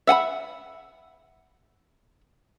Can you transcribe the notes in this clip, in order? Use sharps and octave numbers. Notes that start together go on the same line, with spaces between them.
E5 F#5 G#5 B5